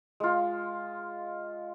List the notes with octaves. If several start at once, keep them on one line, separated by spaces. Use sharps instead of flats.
G#3 F4